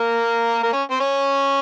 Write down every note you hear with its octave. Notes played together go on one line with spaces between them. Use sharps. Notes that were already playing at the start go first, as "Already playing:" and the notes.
Already playing: A#3 A#4
A#3 A#4
C#4 C#5
C4 C5
C#4 C#5